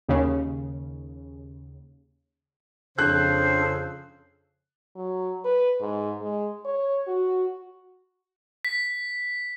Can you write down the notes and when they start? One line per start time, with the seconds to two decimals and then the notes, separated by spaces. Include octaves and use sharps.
0.08 D#2 C#3
2.99 F2 C#3 D4 A4 C5 F#6
4.96 F#3
5.45 B4
5.80 G#2
6.21 G#3
6.65 C#5
7.07 F#4
8.65 B6